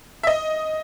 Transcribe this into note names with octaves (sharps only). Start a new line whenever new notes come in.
E5
D#5